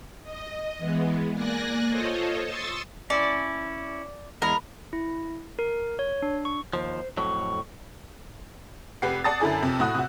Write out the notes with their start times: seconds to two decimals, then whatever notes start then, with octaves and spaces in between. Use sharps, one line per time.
0.23 D#5
0.78 E3 G#3 B3
1.32 A#3 D5 G#5 F#6 A#6
1.89 F4 A4 C5 C#5 D#5
2.42 C6 C#6 D#6 E6 A6
3.10 C#4 E4 D5
4.42 E2 G#3 A#4 B5
4.93 E4
5.59 A#4
5.99 C#5
6.22 D4
6.45 C#6
6.73 D#2 F3 C5
7.17 F2 A2 F#3 C#6
9.02 F1 G4 B4 F#5 C7
9.24 D5 F#5 A5 D#6 A6
9.40 F#2 D3 E4 A4 G#5
9.62 F2 C3
9.80 A2 F#4 D#6 F#6
9.94 C3 F#4